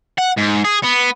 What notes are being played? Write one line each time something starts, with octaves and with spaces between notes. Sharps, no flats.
F#5
G#2
G#4
B3